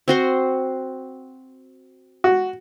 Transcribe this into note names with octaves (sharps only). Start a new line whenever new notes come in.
C4 F#4 C6
F#4